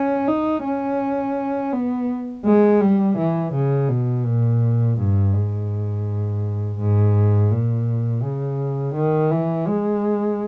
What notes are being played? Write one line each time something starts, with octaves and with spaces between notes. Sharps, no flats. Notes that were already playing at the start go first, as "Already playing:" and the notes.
Already playing: C#4
D#4
C#4
B3
G#3
G3
E3
C#3
B2
A#2
G2
G#2
G#2
A#2
C#3
D#3
E3
G#3